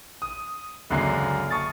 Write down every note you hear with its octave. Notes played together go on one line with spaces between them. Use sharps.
D#6
C#2 F#2 D3 A#3 G#5 C7
A5 C#6 D#6 A6